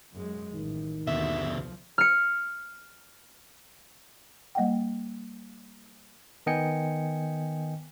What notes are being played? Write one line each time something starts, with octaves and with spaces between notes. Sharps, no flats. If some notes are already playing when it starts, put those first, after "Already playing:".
F#2 G#3
A1 D#3
D#2 B2 D3 E5
C2 F3
F6 C#7
G3 A#3 D#5 F#5 G5
D#3 B3 D#5 G5 G#5 C#7